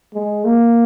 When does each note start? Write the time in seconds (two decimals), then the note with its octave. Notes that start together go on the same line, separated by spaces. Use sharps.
0.15 G#3
0.45 A#3